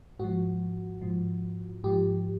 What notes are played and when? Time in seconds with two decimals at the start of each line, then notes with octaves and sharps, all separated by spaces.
0.19 G#2 F3 F#4
1.02 G#2 F3
1.84 G#2 F3 G4